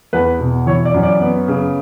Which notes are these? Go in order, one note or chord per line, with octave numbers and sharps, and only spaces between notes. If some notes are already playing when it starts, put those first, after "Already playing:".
E2 B4
B2
E3 C#5
D5
F#2
D5
B3
C#3